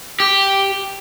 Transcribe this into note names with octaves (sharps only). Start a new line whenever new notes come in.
G4